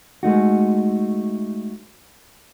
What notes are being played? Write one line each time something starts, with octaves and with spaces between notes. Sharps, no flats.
G#3 A3 D#4 F#4